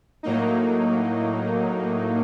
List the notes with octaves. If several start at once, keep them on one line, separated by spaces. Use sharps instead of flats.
A2 F#3 A#3 D#4